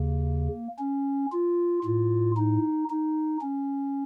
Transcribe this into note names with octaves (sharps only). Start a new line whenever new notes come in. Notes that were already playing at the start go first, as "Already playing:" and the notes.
Already playing: D#2 C#3 A#3
C#4
F4
A2 F4
D#4
D#4
C#4